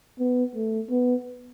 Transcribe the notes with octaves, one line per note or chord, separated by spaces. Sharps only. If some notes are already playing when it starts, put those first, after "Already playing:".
B3
A3
B3